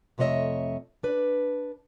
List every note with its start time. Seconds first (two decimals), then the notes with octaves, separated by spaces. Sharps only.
0.18 F2 C3 A3 C#5 D#5 E5
1.03 D4 B4